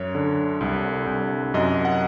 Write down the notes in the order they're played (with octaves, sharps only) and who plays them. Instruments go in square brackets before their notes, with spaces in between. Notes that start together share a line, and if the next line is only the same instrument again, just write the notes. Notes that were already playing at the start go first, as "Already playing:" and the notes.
Already playing: [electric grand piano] F#2 C#5
D3
C2
C2
F#2 D#5
F#5